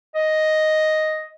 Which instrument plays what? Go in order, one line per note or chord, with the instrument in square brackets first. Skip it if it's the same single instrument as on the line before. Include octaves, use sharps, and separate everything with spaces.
[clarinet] D#5